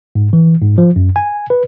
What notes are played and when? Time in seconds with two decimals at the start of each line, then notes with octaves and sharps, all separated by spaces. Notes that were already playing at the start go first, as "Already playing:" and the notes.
0.15 G#2
0.33 E3
0.62 G#2
0.78 F3
0.96 F#2
1.16 G#5
1.50 B4